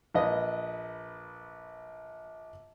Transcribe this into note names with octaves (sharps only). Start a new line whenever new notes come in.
A#1 B4 D#5